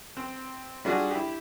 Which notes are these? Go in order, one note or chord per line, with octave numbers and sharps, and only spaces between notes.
C4
G3 D4 F4 F#4 G#4
E4 G4